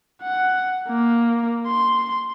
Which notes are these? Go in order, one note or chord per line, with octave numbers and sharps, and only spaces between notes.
F#5
A#3
C6